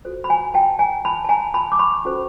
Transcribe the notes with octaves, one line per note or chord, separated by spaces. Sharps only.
F#4 A4 C5
B5
G#5 A#5
G5 A5
G#5 A#5
A5 B5
A5
G#5 A#5
A5 B5
D6
B5 C#6
C#4 F#4 A4 C5